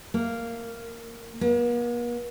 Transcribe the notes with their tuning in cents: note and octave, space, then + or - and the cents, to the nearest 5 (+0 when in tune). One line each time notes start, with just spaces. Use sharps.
A#3 -10
A#3 +45